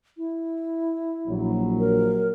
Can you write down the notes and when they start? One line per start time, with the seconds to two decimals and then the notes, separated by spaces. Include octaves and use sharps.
0.17 E4
1.28 A#1 F#3
1.80 A#4